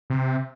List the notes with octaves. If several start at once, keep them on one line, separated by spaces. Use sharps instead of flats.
C3